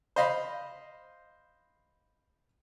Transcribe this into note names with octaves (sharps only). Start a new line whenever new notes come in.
C5 D#5 F5 B5